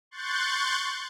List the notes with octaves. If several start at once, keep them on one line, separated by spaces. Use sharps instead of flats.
C6 C#6 F#6 G6 A6